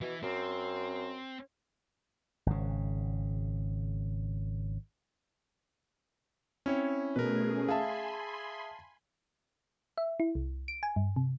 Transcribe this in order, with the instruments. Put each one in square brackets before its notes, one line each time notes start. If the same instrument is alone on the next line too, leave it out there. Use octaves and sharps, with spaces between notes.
[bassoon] B2 [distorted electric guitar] E3
[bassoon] F#2 [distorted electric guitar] C4
[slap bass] G#1 C#3
[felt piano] C4 [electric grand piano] C#4 E4 C#5
[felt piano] B2 [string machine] A3 C#4 G#4 [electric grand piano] A#4 B4
[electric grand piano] G#4 E5 [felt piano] F5 A5 [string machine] G#5 B5 C6
[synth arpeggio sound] E5
E4
C2
D7
G#5
G2
C3